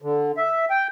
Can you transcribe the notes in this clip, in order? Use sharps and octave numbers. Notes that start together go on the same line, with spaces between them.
D3
E5
G5